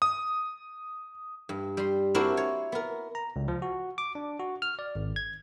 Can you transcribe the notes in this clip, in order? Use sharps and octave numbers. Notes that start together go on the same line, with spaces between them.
D#6
G2
G3 C6
C4 D4 E4 F#4 A#4 C5
C#5
B3 A#4
A#5
C#2
F3
F#4
D6
D4
F#4
F6
D5
G#1
G#6